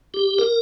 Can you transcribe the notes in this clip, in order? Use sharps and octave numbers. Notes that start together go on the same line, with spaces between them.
G4
A#4